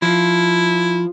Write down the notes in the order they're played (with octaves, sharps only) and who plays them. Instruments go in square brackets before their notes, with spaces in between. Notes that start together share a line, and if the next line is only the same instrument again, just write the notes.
[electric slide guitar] F3 [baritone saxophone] E4